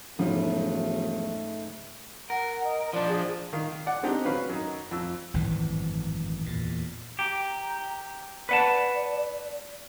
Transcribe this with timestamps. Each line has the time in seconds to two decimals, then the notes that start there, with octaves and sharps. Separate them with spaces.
0.19 E1 G#2 C#3 F3 F#3 A3
2.30 A#4 F#5
2.64 D#5
2.93 F3 D4 D5
3.09 G#4
3.53 D#3 F5
3.86 D5 F#5
4.03 G#3 C4 D4 D#4 G4
4.25 F#3 C#4 B4 F5
4.49 F#2 D#4
4.91 F2 E6
5.34 G#1 F#2 A2 E3
6.46 E2 A#2
7.19 G4 A#5
8.49 B4 D5 F#5 A5